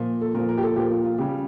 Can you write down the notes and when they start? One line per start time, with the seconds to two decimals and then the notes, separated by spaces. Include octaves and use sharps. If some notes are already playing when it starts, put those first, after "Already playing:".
Already playing: A#2 F3
0.21 A4
0.35 A#2 F3 A#4
0.49 A#4
0.58 G4
0.63 A4
0.76 A#2 F3 G4
0.91 F4
1.04 F4
1.18 C#3 G3 G4